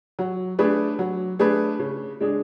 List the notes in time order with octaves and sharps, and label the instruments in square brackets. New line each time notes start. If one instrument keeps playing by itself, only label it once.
[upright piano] F#3
A3 D4 G#4 B4
F#3
A3 D4 G#4 B4
C#3
G#3 D4 G#4